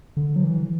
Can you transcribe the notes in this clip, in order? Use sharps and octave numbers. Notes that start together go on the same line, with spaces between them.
D3
F#3
E3